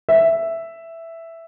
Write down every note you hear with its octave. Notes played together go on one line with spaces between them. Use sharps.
E5